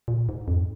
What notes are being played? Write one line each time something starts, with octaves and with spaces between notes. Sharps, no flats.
A#2
G#2
F2